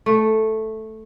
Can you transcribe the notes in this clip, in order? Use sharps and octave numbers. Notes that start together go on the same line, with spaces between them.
A3